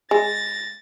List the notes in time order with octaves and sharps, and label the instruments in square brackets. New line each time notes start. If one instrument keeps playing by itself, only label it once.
[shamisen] G#3 [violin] A6 A#6